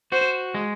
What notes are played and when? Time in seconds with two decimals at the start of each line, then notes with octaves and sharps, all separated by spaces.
0.12 F#4 C5
0.54 G#3